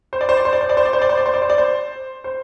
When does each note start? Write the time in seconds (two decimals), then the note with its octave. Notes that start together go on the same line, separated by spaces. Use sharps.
0.13 C5
0.21 D5
0.29 C5
0.37 D5
0.45 C5
0.53 D5
0.61 C5
0.69 D5
0.77 C5
0.85 D5
0.93 C5
1.02 D5
1.09 C5
1.18 D5
1.26 C5
1.34 D5
1.42 C5
1.50 D5
1.58 C5
2.24 C5